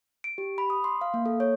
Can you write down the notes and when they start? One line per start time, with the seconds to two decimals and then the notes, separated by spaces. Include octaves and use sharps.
0.24 D7
0.38 G4
0.58 B5
0.70 D#6
0.84 C6
1.01 F5
1.14 A#3
1.26 A4
1.40 C#5